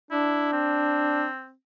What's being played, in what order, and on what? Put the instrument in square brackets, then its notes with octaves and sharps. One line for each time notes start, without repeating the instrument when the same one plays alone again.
[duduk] D4 [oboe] E4
[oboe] C4